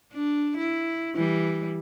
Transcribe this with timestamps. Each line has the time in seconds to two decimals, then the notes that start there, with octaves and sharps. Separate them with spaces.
0.13 D4
0.58 E4
1.15 E3 G3